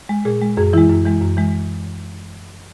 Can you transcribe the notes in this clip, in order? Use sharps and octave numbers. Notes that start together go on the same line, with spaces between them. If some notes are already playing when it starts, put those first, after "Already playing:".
G#3
A#2 G#4
G#3
F#2 G#4
E3 G#3 E4
F#2
E3 G#3
F#2
E3 G#3